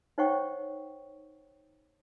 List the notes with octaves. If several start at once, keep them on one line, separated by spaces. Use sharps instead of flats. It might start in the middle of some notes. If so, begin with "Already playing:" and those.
D#4 C5 C#5 F#5 G5 C#6